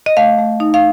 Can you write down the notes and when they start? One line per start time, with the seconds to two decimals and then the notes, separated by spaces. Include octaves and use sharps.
0.06 D#5
0.17 A3 F5
0.38 A3
0.60 D#4
0.74 F5